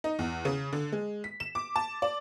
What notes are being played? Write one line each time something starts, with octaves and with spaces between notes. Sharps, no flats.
D#4
E2
C#3
D3
G#3
B6
E7
D6
A5
D5